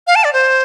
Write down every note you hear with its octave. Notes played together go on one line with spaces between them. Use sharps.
F5
A5
D5
C5